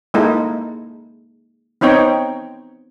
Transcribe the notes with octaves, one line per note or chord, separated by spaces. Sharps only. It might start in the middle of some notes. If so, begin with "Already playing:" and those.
G#3 A#3 D#4 E4 A4
B3 C4 D#4 C#5 G5